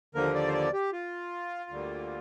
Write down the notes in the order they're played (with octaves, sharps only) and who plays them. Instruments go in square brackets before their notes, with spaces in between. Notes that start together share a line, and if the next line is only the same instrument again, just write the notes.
[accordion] D#2 D3 F3 A#3 A#4
D5
C5
D5
G4
F4
D2 D3 G3 A#3